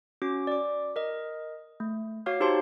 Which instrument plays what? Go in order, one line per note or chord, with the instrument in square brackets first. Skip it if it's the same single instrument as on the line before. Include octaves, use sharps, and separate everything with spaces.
[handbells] C#4 F#4 D6
D5 D6
A#4 D#5
A3
F#4 C#5 F5 D6 F6
D#4 F#4 G4 C5 A5 C6